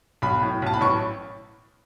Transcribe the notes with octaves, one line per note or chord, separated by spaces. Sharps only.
B1 B5
A2
B1 A5
B5
A1 C#6